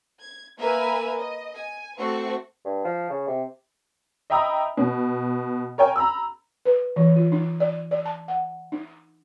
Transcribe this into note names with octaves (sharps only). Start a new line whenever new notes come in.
G#6
A#3 A#4 B4 E5 G#5
D#5
G#5
A3 C4 F#4 C5 C#6
G2
F3
C#3
C3
D#5 E5 G5 A#5 B5 D#6
B2
A#4 C#5 G5 G#5
A#5 B5 E6
B4
E3
F4
D#4
D5
D5
A5
F#5
D#4